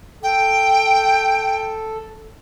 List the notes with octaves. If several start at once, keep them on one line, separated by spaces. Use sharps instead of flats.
A4 G5